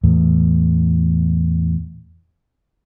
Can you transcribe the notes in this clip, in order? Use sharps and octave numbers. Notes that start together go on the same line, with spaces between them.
E2 A2